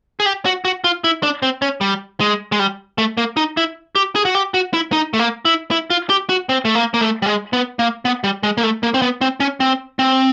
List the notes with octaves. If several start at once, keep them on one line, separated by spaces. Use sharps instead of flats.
G#4
G4
F#4
F#4
F4
E4
D4
C4
C#4
G3
G#3
G#3
G3
A3
A#3
D#4
E4
G4
G#4
F#4
G4
F#4
E4
D#4
A3
A#3
E4
E4
F4
G4
F#4
C4
A3
A#3
A#3
A3
G3
G#3
B3
A#3
B3
G3
G#3
A#3
A3
A#3
C4
B3
C4
C#4
C4
C4